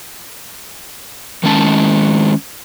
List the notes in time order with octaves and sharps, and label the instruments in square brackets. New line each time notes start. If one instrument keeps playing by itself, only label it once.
[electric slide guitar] D#3 G#3 C#4 A5